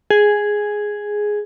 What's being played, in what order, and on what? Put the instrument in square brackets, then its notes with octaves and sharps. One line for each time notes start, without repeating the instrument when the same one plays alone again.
[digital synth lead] G#4